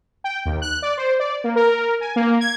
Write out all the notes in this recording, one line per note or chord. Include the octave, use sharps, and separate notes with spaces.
G5
D#2
F#6
D5
C5
D5
A#3
A#4
G#5
A#3
G#6